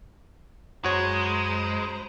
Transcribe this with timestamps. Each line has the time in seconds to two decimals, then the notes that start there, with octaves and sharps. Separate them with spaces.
0.84 F#2 G#3 F#4 C5 C#5 A#5 B5